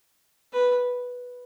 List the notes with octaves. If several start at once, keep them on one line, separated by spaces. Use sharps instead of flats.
B4